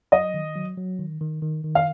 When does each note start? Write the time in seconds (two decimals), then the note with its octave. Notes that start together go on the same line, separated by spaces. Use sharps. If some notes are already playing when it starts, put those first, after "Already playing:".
0.12 F#3 D#5
0.34 D#3
0.56 F#3
0.77 F#3
0.99 D#3
1.21 D#3
1.42 D#3
1.64 D#3
1.75 F5